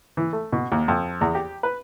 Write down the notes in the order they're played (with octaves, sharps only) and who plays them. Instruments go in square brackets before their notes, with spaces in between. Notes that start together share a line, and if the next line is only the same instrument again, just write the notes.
[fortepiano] E3
A3
B2
D#2
F2
E2
G4
B4